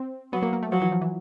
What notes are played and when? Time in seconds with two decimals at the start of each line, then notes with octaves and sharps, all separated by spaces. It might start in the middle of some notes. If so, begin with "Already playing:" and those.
Already playing: C4
0.33 F#3 B3
0.42 A#3
0.53 A#3
0.62 A3
0.72 F3 F#3
0.82 E3
0.92 F3
1.01 E3